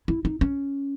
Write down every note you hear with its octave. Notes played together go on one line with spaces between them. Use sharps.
E4
D#4
C#4